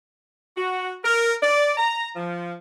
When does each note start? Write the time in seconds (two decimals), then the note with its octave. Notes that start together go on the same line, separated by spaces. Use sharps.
0.57 F#4
1.05 A#4
1.43 D5
1.78 A#5
2.16 F3